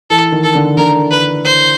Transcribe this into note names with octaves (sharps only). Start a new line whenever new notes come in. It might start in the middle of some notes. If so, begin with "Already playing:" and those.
E3 A4
D#3
A4
D3
D3 A#4
B4
C5